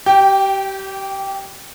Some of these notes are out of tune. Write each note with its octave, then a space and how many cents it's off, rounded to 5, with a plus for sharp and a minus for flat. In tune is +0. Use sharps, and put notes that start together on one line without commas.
G4 -25 G5 +0